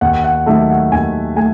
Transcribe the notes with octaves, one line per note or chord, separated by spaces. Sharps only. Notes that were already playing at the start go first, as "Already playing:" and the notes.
D#2 F#5
F#5
D#3 F#3 A3 E5
F#5
D#2 G#5
A3 G#5